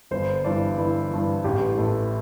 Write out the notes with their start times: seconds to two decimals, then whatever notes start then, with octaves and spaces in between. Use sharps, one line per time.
0.11 G1 C5
0.44 G2 E3 D5
0.78 G1 E4
1.11 G2 E3
1.44 A1 G4
1.78 A2 E3 A4